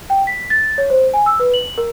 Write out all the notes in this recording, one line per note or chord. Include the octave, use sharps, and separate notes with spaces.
G5
B6
A6
C#5
C5
G#5
E6
B4
F#7
A#4